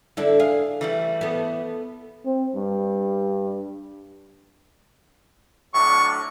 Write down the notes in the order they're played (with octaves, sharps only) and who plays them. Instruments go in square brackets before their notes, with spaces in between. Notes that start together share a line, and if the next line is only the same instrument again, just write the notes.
[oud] D3 D4 A4 [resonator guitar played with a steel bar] E4
[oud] G#4 [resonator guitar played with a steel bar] F5
[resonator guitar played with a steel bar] E3 G3 A3
[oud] B3 A4
[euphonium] C4
G2
[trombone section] A2 F#3 D4 [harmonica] C#6